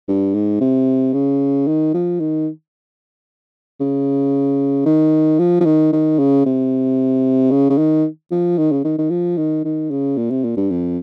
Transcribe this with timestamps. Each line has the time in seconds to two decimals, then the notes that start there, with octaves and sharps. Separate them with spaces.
0.09 G2
0.34 G#2
0.61 C3
1.14 C#3
1.67 D#3
1.94 F3
2.20 D#3
3.80 C#3
4.86 D#3
5.39 F3
5.61 F3
5.65 D#3
5.93 D#3
6.19 C#3
6.46 C3
7.51 C#3
7.70 C#3
7.78 D#3
8.31 F3
8.58 D#3
8.72 C#3
8.85 D#3
8.98 D#3
9.10 F3
9.37 D#3
9.65 D#3
9.91 C#3
10.17 A#2
10.30 C3
10.44 A#2
10.57 G2
10.70 F2